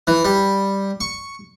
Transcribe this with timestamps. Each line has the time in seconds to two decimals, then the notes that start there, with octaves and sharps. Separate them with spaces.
0.07 E3
0.25 G3
1.01 C#6